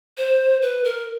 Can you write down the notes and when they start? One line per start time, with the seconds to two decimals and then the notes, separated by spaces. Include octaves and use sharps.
0.18 C5
0.62 B4
0.84 A#4